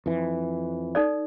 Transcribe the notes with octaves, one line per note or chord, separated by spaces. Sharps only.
F2 E3
D#4 A4 D5